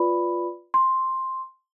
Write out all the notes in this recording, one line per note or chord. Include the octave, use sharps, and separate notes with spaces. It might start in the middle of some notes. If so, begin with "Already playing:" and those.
Already playing: F4 B4 D5 B5
C6